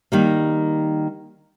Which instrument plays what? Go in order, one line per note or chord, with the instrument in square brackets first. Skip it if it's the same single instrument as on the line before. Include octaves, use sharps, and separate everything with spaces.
[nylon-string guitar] D#3 G3 A#3